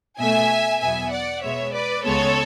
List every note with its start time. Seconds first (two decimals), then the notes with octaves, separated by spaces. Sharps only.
0.19 B2 A3 E5 G#5
0.81 E2 B2 F#3 B3 E5 G#5
1.12 D5 F#5
1.42 B2 G#3 B3 C#5 E5
1.73 B4 D5
2.04 C#2 C#3 G#3 B3 A4 C#5